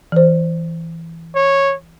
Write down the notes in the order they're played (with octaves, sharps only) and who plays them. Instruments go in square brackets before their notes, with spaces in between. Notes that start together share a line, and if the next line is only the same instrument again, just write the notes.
[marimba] E3 C5
[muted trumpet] C#5